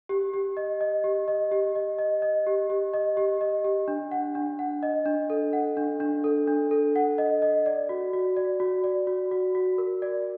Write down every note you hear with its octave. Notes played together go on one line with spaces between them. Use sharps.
G4
G4
D#5
D#5
G4
D#5
G4
D#5
D#5
D#5
G4
G4
D#5
G4
D#5
G4
D4
F#5
D4
F#5
D#5
D4
A4
F#5
D4
D4
A4
D4
A4
F#5
D#5
D#5
D5
F#4
F#4
D5
F#4
D5
F#4
F#4
F#4
A#4
D5